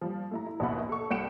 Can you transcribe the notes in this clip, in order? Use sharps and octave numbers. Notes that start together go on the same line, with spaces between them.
F3 G3
A3 E4 A#5
E4
A#1 D#2 B2 E5 F#5 B5
A4 C#6
C2 F#5 G5 C#7 D7 E7